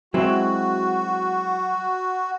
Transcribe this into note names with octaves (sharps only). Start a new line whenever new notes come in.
F#3 G#3 C4 E4 F#4